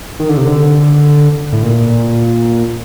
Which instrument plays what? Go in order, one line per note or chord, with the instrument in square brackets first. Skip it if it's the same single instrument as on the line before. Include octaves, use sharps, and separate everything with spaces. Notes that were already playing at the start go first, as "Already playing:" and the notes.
[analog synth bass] D#3
D3
C3
D3
A2
A#2